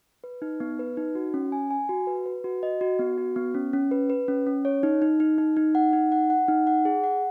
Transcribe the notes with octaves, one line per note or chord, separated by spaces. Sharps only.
B4
D#4
B3
B4
D#4
F#4
C#4
G#5
G#5
F#4
B4
B4
F#4
D#5
F#4
B3
F#4
B3
C#4
C#4
B4
B4
C#4
C#4
C#5
D#4
D#4
D#4
D#4
D#4
F#5
D#4
F#5
F#5
D#4
F#5
G#4
F#5